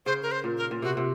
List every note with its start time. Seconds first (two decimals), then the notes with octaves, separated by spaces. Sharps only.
0.06 C#3 C5
0.23 A#4
0.32 C5
0.44 A#2
0.57 A#4
0.71 A#2
0.82 C3 F#4
0.97 C3